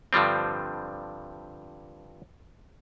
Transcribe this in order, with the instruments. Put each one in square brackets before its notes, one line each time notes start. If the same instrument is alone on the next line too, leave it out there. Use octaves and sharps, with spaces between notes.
[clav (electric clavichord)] G2 D3 F3 G3 C4